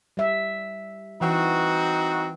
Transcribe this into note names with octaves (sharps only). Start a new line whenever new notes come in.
G3 E5
E3 C4 D#4 F#4